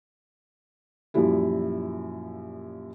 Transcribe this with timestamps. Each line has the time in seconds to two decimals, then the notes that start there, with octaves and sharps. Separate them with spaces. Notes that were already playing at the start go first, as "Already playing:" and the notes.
1.14 F#2 A#2 F3 G3 E4